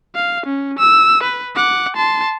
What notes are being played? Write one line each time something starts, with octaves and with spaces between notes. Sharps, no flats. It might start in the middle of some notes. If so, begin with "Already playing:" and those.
F5
C#4
E6
B4
F#5 D6
A5 C6